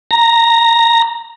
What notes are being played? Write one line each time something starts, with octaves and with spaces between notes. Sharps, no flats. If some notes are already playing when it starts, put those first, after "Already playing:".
A#5